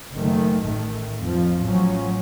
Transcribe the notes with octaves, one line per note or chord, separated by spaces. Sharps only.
F#1 D#3 A3
A1 D#3 A3
F2 F3
A1 F3 F#3 C#4